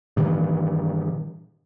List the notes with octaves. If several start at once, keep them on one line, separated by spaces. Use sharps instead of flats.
G2 A#2 D#3 E3